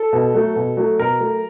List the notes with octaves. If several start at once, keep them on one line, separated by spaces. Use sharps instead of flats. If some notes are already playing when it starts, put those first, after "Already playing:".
Already playing: A4
B2
F#3 A3
B2
F#3 A3
B2 A#4
F#3 A3